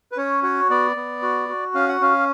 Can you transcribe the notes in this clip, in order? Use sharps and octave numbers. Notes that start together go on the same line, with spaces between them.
B4
C#4 C#5
F#4 C#5
B3 D5
B3
F#4
F#4
C#4 F5
F#5
C#4 F5